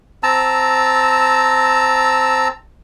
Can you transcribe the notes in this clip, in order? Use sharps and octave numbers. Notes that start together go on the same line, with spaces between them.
C4 A5 A#5 E6